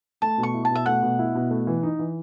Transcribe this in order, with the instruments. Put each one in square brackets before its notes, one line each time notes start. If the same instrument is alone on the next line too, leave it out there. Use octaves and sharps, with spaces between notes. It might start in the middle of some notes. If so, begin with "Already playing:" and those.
[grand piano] A3 [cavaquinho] A5
[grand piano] B2
[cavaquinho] C#6
[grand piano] E4
[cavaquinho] A5
[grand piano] B2 [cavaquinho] E5
[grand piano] A3 [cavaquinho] F#5
[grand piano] B2
E4
B2
A3
E3
D#4
E3